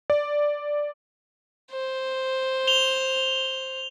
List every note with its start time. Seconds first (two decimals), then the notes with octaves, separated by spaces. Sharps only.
0.10 D5
1.72 C5
2.67 F7 G7